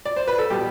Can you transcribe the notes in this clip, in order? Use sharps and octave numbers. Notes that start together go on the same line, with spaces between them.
D5
C5
B4
A4
B2 G3 G4